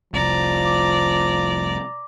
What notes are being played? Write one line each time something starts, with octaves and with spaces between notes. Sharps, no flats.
F1 C2 F3 D5 A#5
D6